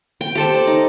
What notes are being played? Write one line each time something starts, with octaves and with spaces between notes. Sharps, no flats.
G5
G4 A4 C5
D5
D#4